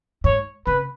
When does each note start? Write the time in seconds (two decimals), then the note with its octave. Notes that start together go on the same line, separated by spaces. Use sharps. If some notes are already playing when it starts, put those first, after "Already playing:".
0.24 G#2 C#5
0.66 C#3 B4